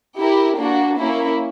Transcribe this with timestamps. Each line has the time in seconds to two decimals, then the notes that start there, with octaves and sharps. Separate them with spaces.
0.18 E4 G4 A#4
0.58 A#3 D4 F#4
0.97 A#3 C#4 E4